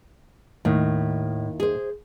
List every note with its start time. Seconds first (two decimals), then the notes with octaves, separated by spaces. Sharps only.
0.65 D#2 A2 D#3
1.60 G#4 C5